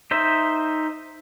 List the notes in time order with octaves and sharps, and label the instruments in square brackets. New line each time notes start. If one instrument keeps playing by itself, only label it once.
[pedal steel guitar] D#4 C5 E5